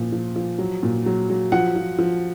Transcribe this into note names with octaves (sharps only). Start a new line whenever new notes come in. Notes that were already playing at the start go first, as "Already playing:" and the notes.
Already playing: A#2 F3
F3
F3
F#3
A#2
F#3
F#3
F3 F#5
F3
F3